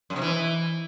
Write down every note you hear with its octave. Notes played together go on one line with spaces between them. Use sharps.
F#2
C3
E3